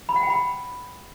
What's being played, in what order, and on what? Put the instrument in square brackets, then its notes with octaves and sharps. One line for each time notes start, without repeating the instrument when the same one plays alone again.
[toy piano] B5
F#5
G5
B5